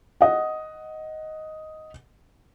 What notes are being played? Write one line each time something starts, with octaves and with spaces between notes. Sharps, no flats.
D#5 F#5